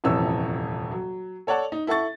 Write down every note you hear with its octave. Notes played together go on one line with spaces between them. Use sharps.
D#1 F2 C3 E3 C#5 E6
F#3
A4 C#5 D5 F#5 A5
D#4
E4 A4 F#5 C#6 A6